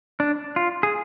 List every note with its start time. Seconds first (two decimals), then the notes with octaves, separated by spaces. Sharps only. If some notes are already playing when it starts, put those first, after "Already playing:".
0.20 D4
0.56 F4
0.83 G#4